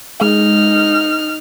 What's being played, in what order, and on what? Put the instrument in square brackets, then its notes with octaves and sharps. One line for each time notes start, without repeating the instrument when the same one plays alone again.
[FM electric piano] G#3 [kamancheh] D#4 F6